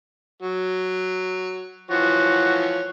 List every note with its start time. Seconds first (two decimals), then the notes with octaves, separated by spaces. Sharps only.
0.42 F#3
1.91 E3 F3 F#4 C#5